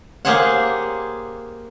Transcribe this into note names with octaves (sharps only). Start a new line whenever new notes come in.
A#3 G4 G#4 C5 C#5 F#5